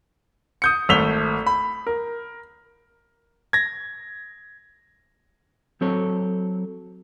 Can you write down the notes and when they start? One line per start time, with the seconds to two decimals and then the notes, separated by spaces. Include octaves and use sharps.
0.62 D#6 G6 C#7
0.89 G#1 A3 E6 B6 F7 G7
1.47 B5
1.87 A#4
3.53 G#6 A#6
5.81 F#3 C4 A4 C#5